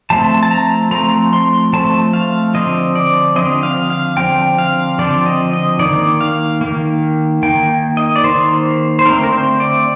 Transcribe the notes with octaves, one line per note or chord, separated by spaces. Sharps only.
F3 A3 C4 A5
A5
A#5
F3 A3 C4 A#5
C6
F3 A3 C4 A5
F5
D3 F3 C4 D#5
D5
D3 F3 C4 D#5
F5
F5
D3 F3 C4 G5
F5
D3 F3 C4 D5
D#5
D#5
D#3 A#3 D5
F5
D#3 A#3
D#3 A#3 G5
D#5
D5
D#3 A#3 C5
C5
D3 A3 C4 A#4
A#4
C5
D5